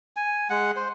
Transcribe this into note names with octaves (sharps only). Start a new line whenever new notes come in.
G#5
G#3 F#5
C5